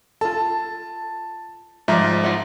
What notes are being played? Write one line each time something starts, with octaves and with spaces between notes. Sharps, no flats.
F4 A4 A5
G#2 F3 G3 E5 A#5
F4 E5 F#5